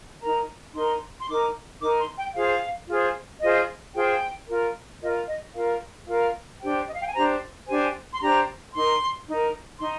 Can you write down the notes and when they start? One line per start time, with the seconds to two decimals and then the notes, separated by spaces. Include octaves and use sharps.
0.22 D#4 A#4 A#5
0.75 D#4 A#4 C6
1.19 C6
1.28 D#4 A#4 D6
1.81 D#4 A#4 D6
1.99 C6
2.17 G5
2.35 F4 G#4 C5 F5
2.88 F4 G#4 C5
3.42 F4 G#4 C5 D#5
3.95 F4 G#4 C5 G5
4.48 F4 A#4
5.02 F4 A#4 D#5
5.28 D#5
5.54 F4 A#4 F5
6.08 F4 A#4 F5
6.62 D4 G4 C5 G5
6.87 D#5
6.93 F5
7.01 G5
7.08 G#5
7.15 D4 G4 C5 A#5
7.68 D4 G4 C5 G#5
8.13 C6
8.22 D4 G4 C5 A#5
8.75 D#4 A#4 C6
9.28 D#4 A#4
9.81 D#4 C6